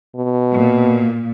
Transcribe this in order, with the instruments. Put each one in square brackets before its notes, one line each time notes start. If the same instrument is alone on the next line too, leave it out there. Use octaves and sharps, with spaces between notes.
[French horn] B2
[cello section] A#2